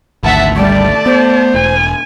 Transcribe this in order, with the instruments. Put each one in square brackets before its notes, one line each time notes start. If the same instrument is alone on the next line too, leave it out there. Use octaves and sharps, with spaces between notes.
[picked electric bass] G#1 D2 [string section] E5 F#5 A5
[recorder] G3 [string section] A3 [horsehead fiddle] D5 A5
[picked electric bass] B3 [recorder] C5
[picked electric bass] E1 [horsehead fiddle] G#5